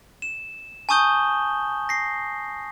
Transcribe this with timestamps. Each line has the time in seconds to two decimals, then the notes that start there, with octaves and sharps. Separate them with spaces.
0.22 E7
0.89 G#5 A5 C#6 D#6 G6 G7
1.89 A#6 C7